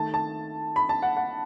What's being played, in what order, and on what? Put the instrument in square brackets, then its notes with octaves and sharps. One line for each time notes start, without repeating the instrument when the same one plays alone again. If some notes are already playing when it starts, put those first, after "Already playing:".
Already playing: [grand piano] D#3 A3 A5
A5
B5
A5
F#5
F#5